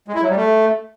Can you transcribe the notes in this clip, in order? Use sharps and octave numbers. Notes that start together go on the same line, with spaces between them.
G#3
E4
F#3
G3
A3